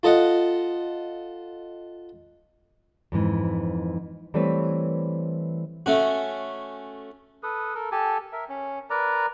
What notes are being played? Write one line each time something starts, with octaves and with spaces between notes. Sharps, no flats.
F4 A4 D#5 F#5
F2 G#2 E3
E3 G3 A3 C4 B4 C#5
A3 C#4 F#4
A4 B4 D#6
A4 A#4
G4 A4 G#5 A5
A#4 E5
C#4
A#4 B4 D5 A#5